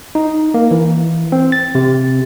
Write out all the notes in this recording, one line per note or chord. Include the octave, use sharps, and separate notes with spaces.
D#4
A#3
E3
C4
A6
C3